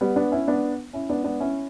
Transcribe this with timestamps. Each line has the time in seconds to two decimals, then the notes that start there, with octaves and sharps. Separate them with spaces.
0.01 G3 B3
0.16 B3 D4
0.31 C#4 E4
0.48 B3 D4
0.93 C#4 E4
1.09 B3 D4
1.24 B3 D4
1.40 C#4 E4